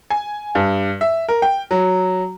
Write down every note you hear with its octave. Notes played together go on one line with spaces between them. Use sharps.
G#5
G2
E5
A#4
G5
F#3